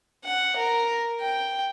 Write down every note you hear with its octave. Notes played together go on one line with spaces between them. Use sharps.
F#5
A#4
G5